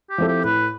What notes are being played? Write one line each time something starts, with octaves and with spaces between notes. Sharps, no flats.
G4
F3 C4 E4 A4
G4
A2 B4